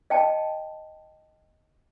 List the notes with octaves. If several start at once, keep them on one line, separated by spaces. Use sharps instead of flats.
D#5 G5 A5